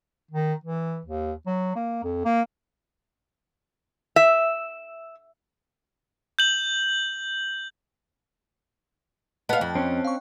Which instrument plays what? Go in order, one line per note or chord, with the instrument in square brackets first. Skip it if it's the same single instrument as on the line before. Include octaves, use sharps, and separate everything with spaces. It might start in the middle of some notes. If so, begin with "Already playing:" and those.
[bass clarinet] D#3
E3
D#2
F#3
A#3
F2
A#3
[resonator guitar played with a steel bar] E5
[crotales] G6 F#7
[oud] B3 F5 [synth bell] D#5 A5 F#6
[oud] F2
[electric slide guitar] C4 C#4
[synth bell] F5 C#6